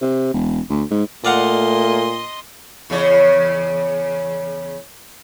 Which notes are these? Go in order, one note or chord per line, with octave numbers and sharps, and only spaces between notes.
C3
E1
D2
G#2
A#2 A3 D5 D#5 F5 F#5 C6
E2 C#3 C#5